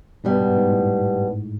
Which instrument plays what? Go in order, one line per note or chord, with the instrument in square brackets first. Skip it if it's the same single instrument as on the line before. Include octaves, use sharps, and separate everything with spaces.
[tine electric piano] G2 [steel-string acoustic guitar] B2 G3 B3
[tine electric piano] G#2
G#2
A2